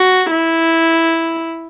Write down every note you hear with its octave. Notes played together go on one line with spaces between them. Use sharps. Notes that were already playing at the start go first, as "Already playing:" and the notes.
Already playing: F#4
E4